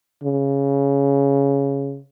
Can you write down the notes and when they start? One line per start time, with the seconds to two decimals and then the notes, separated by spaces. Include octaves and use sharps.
0.23 C#3